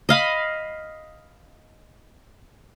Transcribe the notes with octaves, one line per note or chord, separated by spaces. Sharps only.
D#5 F5 B5